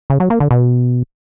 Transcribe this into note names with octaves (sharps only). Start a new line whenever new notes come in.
C#3
F#3
A#3
D3
B2